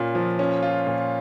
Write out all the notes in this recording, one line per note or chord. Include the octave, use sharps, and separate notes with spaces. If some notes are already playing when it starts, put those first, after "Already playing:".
Already playing: A#2 C#4 F4
F3
C#4
F4
A#2